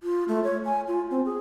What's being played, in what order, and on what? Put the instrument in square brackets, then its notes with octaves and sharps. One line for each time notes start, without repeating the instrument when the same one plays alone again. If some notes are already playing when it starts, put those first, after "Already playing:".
[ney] F4
A3
C#5
G#5
F4
C4
G#4